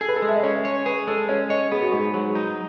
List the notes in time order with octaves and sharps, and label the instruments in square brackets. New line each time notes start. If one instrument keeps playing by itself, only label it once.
[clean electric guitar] G#4 [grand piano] A4
[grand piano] B4
A4
[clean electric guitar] G#3
[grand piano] E5
D#5
[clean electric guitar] C#4 [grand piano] C#5
[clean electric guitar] C#5
[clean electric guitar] G#4 [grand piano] B4
[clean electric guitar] G#3 [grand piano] A4
[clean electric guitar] C#4 [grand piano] C#5
[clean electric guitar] C#5 [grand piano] D#5
[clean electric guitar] B3 [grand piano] G#4
[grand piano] F#4
[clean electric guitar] G#2 [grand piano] G#4
[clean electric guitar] F#3
D#4